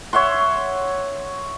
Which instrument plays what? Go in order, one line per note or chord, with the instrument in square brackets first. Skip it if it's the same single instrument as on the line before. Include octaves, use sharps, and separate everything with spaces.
[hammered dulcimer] C#5 E5 F#5 C6